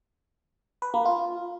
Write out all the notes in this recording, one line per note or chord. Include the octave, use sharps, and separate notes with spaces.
B4
A#3
F4